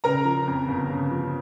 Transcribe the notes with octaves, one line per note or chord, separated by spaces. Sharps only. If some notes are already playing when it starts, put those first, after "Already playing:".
C#3 A#4 A#5
F3
F2
G1
C#3
F3